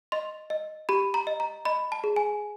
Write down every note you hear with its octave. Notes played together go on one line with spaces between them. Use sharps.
D#5 C6
D#5
G4 B5
A#5
D#5
A#5
D#5 B5
A5
G#4
G#5